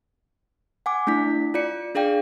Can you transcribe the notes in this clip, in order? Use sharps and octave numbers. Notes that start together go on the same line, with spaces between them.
F#5 G#5 D6
A3 D4 E4 B6
F4 D5 C#7
D4 G#4 D5 F5 G5